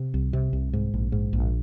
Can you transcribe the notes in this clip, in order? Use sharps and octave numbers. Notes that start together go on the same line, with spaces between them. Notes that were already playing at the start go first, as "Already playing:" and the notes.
Already playing: C3
C2
C3
C2
G#2
A#1
G#2
A#1